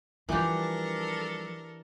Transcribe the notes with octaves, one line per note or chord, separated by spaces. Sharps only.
E3 F3 G3 D4 G4 A4 A#4